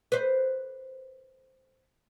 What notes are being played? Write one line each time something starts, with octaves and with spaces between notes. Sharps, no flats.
B4 C5